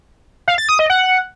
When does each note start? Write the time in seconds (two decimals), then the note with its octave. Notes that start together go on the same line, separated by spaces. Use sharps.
0.48 F5
0.58 A6
0.69 D#6
0.79 D#5
0.90 F#5